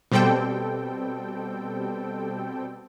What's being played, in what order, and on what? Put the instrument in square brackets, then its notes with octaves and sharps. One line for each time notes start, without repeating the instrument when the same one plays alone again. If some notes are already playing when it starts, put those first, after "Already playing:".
[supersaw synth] B2 G3 C4 A4 G5